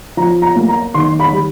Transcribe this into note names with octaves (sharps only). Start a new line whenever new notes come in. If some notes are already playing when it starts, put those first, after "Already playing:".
F3 A#5
A#5
A#3
A#5
D#3 C6
B5
G3